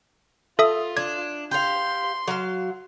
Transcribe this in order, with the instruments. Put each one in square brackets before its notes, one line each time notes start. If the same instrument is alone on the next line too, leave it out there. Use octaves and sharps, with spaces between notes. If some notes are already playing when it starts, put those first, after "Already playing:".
[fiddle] F4 [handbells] A4 E5 D#6
[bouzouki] D4 [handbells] G#6
[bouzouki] G4 F5 [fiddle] C6
[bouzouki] F#3 F5